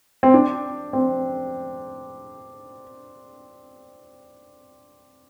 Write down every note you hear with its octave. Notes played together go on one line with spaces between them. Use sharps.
C4
D4
C4